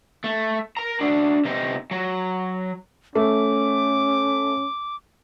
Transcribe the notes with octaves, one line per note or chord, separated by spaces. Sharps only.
A3
A#4 A#5
D4 F#4
C3 D#4
F#3
A3 C#4 D6